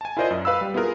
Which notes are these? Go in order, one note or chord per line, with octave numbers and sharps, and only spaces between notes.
G#5 A5
E4 F4 A#4 C5 D5 D#5
F#2
B4 F5 B5 E6
G3
B3 E4 F4 G#4 A#4